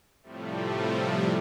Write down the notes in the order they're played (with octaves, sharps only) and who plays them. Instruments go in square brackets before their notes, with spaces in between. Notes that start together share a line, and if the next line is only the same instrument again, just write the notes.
[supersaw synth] A2 C3 F3 G3 A3